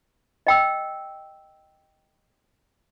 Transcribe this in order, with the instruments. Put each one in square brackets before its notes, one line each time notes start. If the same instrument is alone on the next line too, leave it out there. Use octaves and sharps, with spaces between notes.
[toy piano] D#5 G5 E6